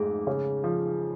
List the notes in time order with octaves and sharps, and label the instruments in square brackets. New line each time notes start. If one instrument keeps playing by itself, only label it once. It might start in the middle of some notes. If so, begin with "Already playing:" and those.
Already playing: [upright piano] F2 G#2 A3 [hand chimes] G#4
[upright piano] C#3
F3